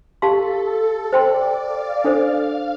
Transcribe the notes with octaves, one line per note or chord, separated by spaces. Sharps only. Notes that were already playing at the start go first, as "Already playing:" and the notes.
G4 A4 F5 A5 C6
C5 D5 G5 C6
F5
D4 A4 C5 F5